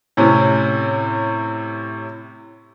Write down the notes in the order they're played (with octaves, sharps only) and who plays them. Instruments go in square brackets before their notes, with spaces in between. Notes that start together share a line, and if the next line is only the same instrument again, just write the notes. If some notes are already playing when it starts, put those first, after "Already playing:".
[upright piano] A2 C3 C#4